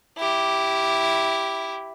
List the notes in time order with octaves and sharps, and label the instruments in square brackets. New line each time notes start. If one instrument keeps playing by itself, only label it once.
[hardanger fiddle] E4 G4